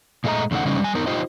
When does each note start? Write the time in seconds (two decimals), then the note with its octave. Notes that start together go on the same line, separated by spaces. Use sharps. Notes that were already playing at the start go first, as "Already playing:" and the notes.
0.24 A#2 G#3 A3 A4 D#5 A#5
0.51 E2 C#3 A3 D#4 F#5
0.65 C#3 G3 C#4 D#4
0.81 G3 G#5
0.95 B3 D#4 A#4
1.07 D#4 F4 G4 C5 D#5